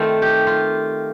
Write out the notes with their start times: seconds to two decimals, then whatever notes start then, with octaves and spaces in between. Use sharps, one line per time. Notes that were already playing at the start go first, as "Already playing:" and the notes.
Already playing: D#3 A3 C4 F4
0.22 G4
0.47 F4